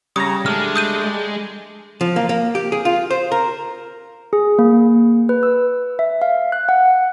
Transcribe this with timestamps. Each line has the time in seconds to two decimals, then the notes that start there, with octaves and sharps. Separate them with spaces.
0.16 C#3 G3 A#5 D#6 A#6
0.46 G#3 A3 D4 F6
0.76 D#6 G6 D#7
2.01 F3
2.16 A#3
2.29 A#3
2.55 G4
2.72 G#4
2.85 F4
3.11 C5
3.32 A#4
4.33 G#4
4.59 A#3
5.29 B4
5.43 E6
5.99 E5
6.22 F5
6.52 F#6
6.69 F#5